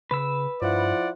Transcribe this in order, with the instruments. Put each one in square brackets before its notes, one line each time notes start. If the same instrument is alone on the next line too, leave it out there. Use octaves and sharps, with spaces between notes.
[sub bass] C#3 [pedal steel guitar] B4 E6
[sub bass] G2 [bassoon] F3 [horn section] E4 D5 F#5